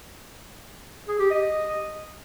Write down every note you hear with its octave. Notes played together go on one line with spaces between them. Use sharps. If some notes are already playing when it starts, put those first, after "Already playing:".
G#4
G4
D#5